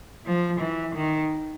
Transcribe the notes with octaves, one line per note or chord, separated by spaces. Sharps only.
F3
E3
D#3